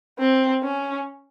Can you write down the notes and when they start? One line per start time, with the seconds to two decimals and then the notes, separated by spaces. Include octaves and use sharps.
0.19 C4
0.63 C#4